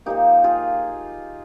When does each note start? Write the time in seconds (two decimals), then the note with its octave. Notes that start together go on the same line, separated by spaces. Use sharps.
0.06 A#2 F3 A#3 D#4 G4
0.44 F4 G#4